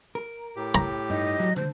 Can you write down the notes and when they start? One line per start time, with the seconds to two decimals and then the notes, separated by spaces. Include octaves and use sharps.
0.15 A#4
0.56 A2 G4
0.75 A#5
1.10 G2 D#4 D#5
1.40 F#3
1.56 D3 C5